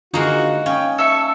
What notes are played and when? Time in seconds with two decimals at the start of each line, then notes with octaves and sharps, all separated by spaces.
0.14 D3 G#3 A#3 D#4 F4 F#4 A#5
0.66 C#4 F5 G5 G#5 D#6
0.98 A4 E5 C#6